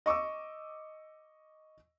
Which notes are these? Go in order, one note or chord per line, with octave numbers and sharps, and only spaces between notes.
D#5 C#6 D6 E6